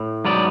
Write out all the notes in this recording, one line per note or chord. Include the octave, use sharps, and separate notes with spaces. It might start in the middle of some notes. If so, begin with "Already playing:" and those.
Already playing: A2
G#2 F#3 B3 D5